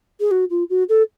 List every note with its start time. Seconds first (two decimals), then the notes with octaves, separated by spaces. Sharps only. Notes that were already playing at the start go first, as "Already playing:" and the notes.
0.20 G#4
0.31 F#4
0.50 F4
0.70 F#4
0.89 A4